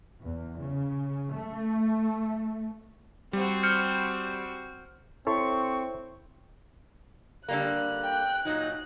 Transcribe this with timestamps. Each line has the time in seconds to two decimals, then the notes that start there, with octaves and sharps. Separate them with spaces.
0.22 E2
0.60 C#3
1.36 A3
3.33 G3 C4 F#4 C5
3.63 F6 G6 C#7
5.27 C4 E4 A4 C#5 C6 C#6
7.48 D3 G3 A#3 F#6
8.03 G5
8.45 A#2 F#3 D#4